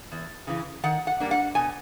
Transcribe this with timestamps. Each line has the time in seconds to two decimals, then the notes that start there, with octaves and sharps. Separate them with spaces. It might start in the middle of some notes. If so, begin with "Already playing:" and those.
0.12 E2
0.47 C#3 E3
0.83 D#3 F#5
1.07 F#5
1.20 G3 A#3 D4
1.31 F#5
1.55 B2 G#5